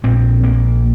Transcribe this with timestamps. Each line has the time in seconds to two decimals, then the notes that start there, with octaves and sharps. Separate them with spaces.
0.04 A#1 A#2 C4
0.43 A#3